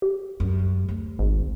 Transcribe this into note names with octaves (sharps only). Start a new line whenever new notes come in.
G4
F#2
D2
G#1